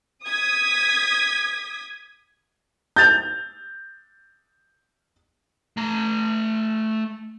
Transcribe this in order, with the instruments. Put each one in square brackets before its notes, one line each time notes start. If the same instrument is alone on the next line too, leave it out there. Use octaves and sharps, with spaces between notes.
[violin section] D#6 G#6 B6
[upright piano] G6 A6 F7
[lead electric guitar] A3 A#5